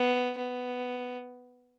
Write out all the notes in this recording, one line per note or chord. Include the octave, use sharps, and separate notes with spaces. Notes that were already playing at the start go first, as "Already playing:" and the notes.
Already playing: B3
B3